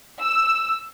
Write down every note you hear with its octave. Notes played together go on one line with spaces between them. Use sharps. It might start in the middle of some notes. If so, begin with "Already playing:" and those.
E6